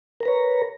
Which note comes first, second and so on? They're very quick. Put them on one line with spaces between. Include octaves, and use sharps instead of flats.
A#4 A#5 B4 C#5